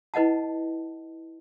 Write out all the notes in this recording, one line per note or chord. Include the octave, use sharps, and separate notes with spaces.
E4 B4 D#5 F#5 A5